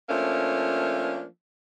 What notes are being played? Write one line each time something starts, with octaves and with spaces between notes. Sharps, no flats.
F3 A3 A#3 C#4 D4